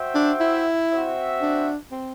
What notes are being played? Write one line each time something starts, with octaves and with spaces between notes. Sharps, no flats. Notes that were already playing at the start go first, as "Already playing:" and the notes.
Already playing: F#4 C5 E5 G5
D4
E4
C4 F#4 C5 E5
D4
C4